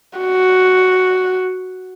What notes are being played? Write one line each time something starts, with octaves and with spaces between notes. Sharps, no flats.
F#4